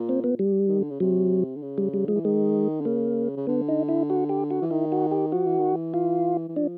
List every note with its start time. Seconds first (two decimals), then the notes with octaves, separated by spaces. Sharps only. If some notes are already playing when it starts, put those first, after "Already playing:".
Already playing: A#2
0.09 C4
0.24 B3
0.39 G3
0.68 D#3
0.80 D3
0.90 C#3
1.00 C3 F#3
1.56 D3
1.62 C#3
1.78 G3
1.94 G3
2.07 F3 G#3
2.15 E3
2.24 D#3 G#3
2.81 D3
2.85 C#3 A#3
3.36 C#3
3.47 D3 B3
3.68 D#4
3.89 E4
4.10 F#4
4.29 G4
4.50 F#4
4.62 E3
4.71 D#3 E4
4.92 F#4
5.11 G4
5.32 F3 F#4
5.45 E3
5.59 D#3
5.72 E3
5.94 F4
6.48 E3
6.56 F3 D4